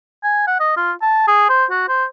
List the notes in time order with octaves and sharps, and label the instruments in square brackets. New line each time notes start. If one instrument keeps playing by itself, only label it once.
[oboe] G#5
F#5
D#5
F4
A5
G#4
C5
F#4
C5